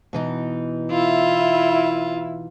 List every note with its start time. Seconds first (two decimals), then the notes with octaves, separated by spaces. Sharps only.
0.13 B2 E3 D#4
0.91 E4 F4 E5